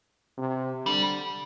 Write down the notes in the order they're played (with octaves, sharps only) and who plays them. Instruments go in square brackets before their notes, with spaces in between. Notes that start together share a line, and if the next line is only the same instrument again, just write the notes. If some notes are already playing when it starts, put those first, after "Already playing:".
[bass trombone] C3
[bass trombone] D3 [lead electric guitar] G3